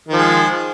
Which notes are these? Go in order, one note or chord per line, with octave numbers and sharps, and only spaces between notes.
D#3 F3 G#3